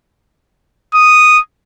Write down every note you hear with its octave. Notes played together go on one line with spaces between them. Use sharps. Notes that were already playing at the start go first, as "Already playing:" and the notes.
D#6